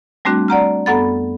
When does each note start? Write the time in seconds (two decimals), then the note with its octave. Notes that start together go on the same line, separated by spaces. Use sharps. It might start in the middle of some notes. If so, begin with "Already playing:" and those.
0.25 G3 A3 C4 D4 F#4
0.48 D5 F#5 A#5 F6
0.86 F#2 B3 A4 F#5 B5 A6